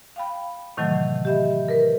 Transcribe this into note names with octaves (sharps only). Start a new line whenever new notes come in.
F5 G5 B5
A2 C3 D#3 E3 F#3 A3
G4 D#5 E5 B5
A#4 B4